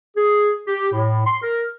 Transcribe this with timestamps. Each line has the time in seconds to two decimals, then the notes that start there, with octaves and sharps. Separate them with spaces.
0.16 G#4
0.68 G4
0.93 A2
1.26 C6
1.42 A#4